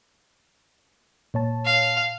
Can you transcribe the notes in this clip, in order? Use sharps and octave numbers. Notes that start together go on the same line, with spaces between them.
A#2 C#5 A5
F5